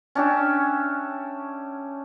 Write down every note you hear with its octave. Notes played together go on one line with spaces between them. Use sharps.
C#4 D4 G4 E5